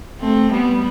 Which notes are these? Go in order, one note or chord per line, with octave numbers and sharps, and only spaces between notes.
A3 C4
G3 B3